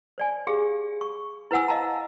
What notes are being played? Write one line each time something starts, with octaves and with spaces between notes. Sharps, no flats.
C5 D5 G#5
G4 G#4 F5
C#6
E4 B4 C5 F#5 G#5 E6
D#5 F5 A5 A#5